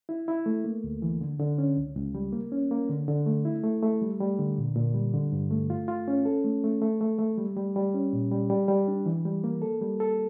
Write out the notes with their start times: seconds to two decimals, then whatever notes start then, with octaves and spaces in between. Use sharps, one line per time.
0.09 E4
0.28 E4
0.46 A3
0.64 A#3
0.84 D2
1.02 E3
1.21 D3
1.40 D3
1.58 C#4
1.77 C#2
1.96 C#2
2.15 G3
2.33 A#3
2.52 C#4
2.71 A#3
2.89 D3
3.08 D3
3.26 A3
3.45 E4
3.63 A3
3.83 A3
4.02 G3
4.20 G3
4.39 D3
4.58 A#2
4.76 A#2
4.95 G3
5.14 D3
5.32 G2
5.51 A3
5.70 F4
5.88 F4
6.08 C#4
6.25 A4
6.44 A3
6.64 A3
6.82 A3
7.01 A3
7.19 A3
7.38 G3
7.57 G3
7.76 G3
7.94 C#4
8.13 A#2
8.32 G3
8.50 G3
8.68 G3
8.88 D4
9.06 E3
9.25 G3
9.44 A#3
9.62 A4
9.81 G3
10.00 A4